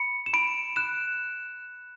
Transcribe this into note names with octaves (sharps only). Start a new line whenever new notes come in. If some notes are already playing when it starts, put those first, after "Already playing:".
Already playing: B5 C#7
E7
B5 D7
F#6 E7